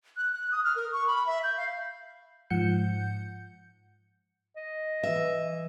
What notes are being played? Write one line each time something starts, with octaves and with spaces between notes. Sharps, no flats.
F#6
F#6
D#6
F6
A#4
C#6
B5
E5
G6
F5
G#2 F3 F#5 G6 C#7
D#5
E3 E5